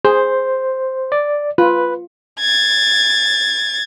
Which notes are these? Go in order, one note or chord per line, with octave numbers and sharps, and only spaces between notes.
G#4 C5
D5
F4 B4
G#6 A6